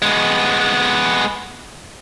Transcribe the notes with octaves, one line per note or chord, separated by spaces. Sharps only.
G#3 B3